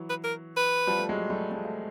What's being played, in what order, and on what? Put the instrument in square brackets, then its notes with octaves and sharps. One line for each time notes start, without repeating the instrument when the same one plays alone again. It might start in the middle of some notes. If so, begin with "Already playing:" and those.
Already playing: [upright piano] E3 F#3
[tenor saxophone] B4
A#4
B4
[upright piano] F3 G3
A3
F#3 G#3
G3 A3
G#3
A3